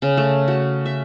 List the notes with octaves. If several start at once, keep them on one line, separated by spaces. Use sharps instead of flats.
C#3
A3
F#4
E5